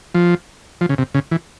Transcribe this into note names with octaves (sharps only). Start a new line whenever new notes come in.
F3
F3
C#3
C3
C#3
E3